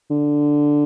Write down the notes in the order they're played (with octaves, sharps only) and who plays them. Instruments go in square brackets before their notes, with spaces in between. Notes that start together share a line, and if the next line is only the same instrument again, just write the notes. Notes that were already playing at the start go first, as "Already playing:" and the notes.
[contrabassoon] D3